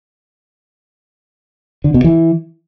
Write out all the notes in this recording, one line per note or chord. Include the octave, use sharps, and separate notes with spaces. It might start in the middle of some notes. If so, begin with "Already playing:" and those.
D3
B2
E3